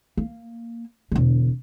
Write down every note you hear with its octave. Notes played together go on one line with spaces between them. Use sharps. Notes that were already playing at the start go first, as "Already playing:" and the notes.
A#3
E1 D3